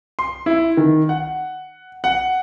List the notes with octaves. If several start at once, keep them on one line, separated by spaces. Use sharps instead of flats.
C6
E4
D#3
F#5
F#5